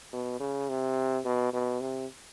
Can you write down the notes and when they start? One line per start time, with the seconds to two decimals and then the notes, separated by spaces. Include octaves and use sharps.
0.13 B2
0.40 C#3
0.69 C3
1.25 B2
1.53 B2
1.81 C3